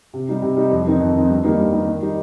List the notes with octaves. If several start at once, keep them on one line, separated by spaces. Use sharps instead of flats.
C3
G3 D#4
C3
G3 D#4
F2
D#3 C4 D#4
F2
D#3 C4 D#4
G2
D#3 G3 A#3 D#4
G2
D#3 G3 A#3 D#4
D#3
G3 D#4